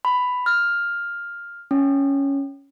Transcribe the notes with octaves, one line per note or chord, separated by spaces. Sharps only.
B5
F6
C#4